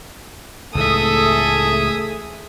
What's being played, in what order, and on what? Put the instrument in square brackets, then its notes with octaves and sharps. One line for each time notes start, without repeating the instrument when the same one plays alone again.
[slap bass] C#2 A2 E3 [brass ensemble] A3 G#4 [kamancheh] A4 [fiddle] E5 D#6